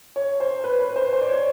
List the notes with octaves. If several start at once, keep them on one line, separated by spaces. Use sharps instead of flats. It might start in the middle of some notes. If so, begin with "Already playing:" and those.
C#5
C5
B4
B4
C5
C5
D5
C#5